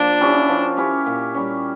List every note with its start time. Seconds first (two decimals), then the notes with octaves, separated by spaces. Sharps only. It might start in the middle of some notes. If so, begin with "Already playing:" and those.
Already playing: F3 A#3 D4
0.21 C#4 E4 G4
0.49 F3
0.77 C#4 E4 G4
1.06 A#2
1.35 G3 C#4